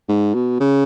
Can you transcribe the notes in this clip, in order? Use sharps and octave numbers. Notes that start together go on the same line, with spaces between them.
G#2
B2
C#3